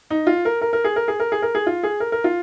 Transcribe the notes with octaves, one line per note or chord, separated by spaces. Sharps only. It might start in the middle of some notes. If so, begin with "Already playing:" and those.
D#4
F4
A#4
A#4
A#4
G#4
A#4
G#4
A#4
G#4
A#4
G#4
F4
G#4
A#4
A#4
F4